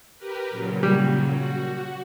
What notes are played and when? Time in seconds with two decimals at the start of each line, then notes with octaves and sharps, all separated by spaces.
0.18 G4 A#4 B4
0.50 A#2 C#3 F#3
0.83 G3
1.30 F#4